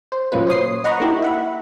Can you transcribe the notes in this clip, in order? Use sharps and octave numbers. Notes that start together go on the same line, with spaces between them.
C5
A#2 F#3 A#3 C#4 F4 B4
C5 C#5 D#6 C7
D#5 F#5 A#5 B5 C#6
A#3 D#4 E4 G4
E5 F#5 B5